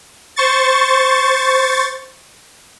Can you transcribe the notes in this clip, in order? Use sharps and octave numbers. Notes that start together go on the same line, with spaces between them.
C5 C#6 A6